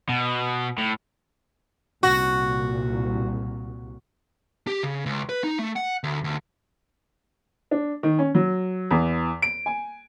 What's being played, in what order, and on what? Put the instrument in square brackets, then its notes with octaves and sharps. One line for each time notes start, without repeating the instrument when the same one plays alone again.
[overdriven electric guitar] B2
A2
[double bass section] C2 A#2 [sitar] F#4
[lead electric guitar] G4
C#3
C#2
B4
D#4
A3
F#5
D2
D2
[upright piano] D4
D#3
C#4
F#3
E2
D7
G#5